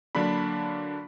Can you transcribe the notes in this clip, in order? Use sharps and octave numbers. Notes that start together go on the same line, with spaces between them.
D3 F#3 A#3 D4 B5